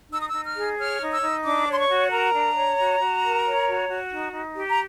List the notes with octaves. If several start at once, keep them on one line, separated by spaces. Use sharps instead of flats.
D#4 E6
D#6
D#4 E6
F6
G#4
C#5 F6
D#4
E6
D#4
D4 D6
C#5 C6
C#6
F#4
A#4 A#5
D4
C#5
F#4
F#4
A#4
C#5
F#4
F#4
D#4
D#4
G4
A#5